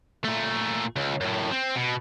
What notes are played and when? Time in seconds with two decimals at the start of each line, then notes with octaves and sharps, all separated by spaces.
0.24 A#2 A3
0.96 C#2
1.21 F#2 A2
1.52 C4
1.76 B2